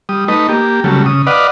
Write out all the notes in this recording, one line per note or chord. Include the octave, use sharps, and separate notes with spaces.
G3 D#6
A3 D#4 B4 D#5
A#3 G4
C#3 F#3 G3 A3
C#3 D#6
B4 D5 D#5 F5 F#5